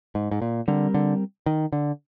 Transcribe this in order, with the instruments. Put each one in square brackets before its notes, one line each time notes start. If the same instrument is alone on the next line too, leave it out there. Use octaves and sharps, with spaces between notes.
[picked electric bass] G#2
G#2
A#2
[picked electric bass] D3 [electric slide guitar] G3 C4 G4 A#4
[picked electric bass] D3
D#3
D3